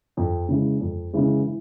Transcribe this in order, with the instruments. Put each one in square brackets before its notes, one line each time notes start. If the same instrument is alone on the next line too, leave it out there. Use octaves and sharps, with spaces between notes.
[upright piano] F2
C#3 E3 G#3
F2
C#3 E3 G#3
E3